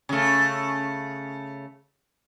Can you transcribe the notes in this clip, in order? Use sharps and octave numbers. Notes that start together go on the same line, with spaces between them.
C#3 A3